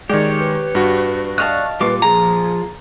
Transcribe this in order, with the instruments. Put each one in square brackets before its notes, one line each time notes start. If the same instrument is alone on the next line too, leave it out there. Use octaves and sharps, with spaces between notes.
[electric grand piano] D#3 G#3 [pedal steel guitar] G4 C#5 [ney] D5
[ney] B4
[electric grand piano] G2 F#4
[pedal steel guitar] D5 C#6 F#6 [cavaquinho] D#5 F5 A5
[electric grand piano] A#2 [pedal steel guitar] G3 F4 D6 [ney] B4
[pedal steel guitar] F3 F4 [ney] G#4 [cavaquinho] A#5